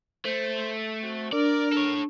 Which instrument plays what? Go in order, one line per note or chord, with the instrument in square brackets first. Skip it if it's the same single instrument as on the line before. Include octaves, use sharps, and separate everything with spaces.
[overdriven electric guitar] A3 [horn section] C5
[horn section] C4 F#4
[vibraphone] D4 [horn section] A#4 [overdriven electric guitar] D5
[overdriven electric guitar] A4 C#5